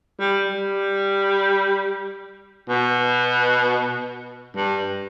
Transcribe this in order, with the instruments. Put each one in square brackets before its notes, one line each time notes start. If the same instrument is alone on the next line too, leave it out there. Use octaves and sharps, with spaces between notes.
[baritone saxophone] G3
G3
B2
G2